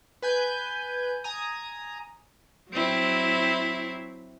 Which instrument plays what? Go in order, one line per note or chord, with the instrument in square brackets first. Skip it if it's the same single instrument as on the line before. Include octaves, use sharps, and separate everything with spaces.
[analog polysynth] B4 G#5 G6
G#5 A#5 D#6
[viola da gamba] F#3 C4 E4